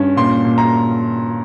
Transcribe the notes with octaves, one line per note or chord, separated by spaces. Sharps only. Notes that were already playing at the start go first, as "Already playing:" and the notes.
Already playing: G2 C#4
A#2 C6
A#2
A#5